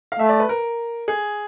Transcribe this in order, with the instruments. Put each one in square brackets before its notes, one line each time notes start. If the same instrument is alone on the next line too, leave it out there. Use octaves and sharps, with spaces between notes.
[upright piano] F5
[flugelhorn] A3 [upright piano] E5
[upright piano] D5
B4
A#4
G#4